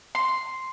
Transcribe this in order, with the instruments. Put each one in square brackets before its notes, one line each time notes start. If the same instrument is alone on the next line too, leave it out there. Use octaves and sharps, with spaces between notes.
[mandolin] C6